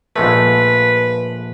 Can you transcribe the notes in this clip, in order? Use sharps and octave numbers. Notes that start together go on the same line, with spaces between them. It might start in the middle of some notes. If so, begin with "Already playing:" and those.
A#1 G#3 A3 B4